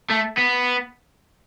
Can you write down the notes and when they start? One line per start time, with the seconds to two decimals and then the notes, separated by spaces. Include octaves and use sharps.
0.11 A3
0.38 B3